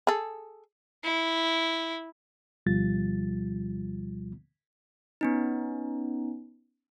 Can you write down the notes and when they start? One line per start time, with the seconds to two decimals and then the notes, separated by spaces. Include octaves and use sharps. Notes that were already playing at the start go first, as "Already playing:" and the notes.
0.07 G#4 A4
1.04 E4
2.66 D2 B2 F3 G3 F4 A6
5.21 B3 C#4 D#4